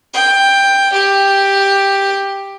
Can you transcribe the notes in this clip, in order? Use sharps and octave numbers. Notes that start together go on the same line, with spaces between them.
G5
G4